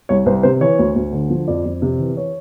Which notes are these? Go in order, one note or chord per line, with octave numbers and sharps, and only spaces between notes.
C2 C#5
C2 C5
C3 C5
E3 C#5
D2
D2
D3
F3
F2 D5
F2
C3
E3
C#5